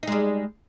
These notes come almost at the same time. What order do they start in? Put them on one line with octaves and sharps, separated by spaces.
D#4 G#3 G3